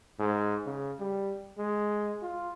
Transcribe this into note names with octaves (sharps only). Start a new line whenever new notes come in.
G#2
C#3
G3
G#3
F4